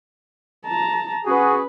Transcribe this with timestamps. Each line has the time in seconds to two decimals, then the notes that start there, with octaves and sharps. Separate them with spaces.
0.65 A5 A#5
1.25 C#4 F#4 G#4 B4